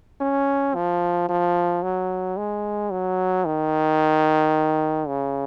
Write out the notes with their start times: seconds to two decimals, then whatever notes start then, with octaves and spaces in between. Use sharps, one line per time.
0.21 C#4
0.75 F3
1.29 F3
1.83 F#3
2.37 G#3
2.91 F#3
3.45 D#3
5.07 C#3